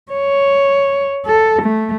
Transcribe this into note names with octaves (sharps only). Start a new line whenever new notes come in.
C#5
A4
A3